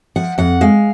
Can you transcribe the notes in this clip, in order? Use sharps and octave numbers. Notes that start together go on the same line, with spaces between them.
F3 F#5
F2 F#5
G#3 F5